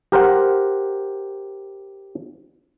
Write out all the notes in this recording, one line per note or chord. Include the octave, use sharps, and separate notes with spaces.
G4 A#4 C5 F#5